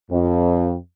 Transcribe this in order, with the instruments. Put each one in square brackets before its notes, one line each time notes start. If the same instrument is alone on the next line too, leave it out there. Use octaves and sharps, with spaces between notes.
[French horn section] F2